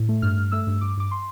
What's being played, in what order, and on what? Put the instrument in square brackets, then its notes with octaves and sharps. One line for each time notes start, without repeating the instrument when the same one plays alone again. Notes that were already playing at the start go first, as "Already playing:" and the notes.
Already playing: [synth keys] A2
A3
G2 F6
G2
A3 E6
G2
G2 D6
G2 D6
C6